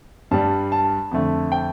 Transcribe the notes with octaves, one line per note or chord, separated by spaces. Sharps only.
G2 G3 A5
A5
F2 D3 A3
G5